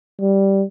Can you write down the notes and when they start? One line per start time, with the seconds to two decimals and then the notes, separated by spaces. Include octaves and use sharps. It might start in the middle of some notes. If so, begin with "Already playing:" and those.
0.20 G3